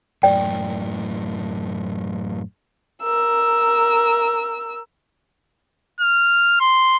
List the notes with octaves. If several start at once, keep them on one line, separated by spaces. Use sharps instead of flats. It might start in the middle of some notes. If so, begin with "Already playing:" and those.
F#2 A2 D5 G5
A#4 E6
F6
C6